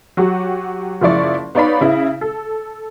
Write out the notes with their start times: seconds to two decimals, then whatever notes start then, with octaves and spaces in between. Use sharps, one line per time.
0.17 F#3 F#4 G4
1.01 F#1 F3 E4 D5 C#6
1.55 B3 D#4 C#5 D5 F5 B5
1.81 C#3 E4
2.21 A4